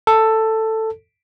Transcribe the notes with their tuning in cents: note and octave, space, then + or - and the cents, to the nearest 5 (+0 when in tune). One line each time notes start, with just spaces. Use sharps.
A4 +10